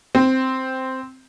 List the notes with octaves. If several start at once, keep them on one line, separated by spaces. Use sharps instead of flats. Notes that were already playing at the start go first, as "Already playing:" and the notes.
C4